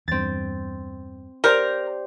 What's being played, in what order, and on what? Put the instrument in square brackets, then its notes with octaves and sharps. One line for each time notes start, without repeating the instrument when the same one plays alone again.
[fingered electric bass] E2 G2 [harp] C4 A6
[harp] G4 C5 D5 [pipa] A#4